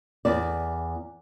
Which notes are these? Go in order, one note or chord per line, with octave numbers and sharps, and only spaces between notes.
E2 D5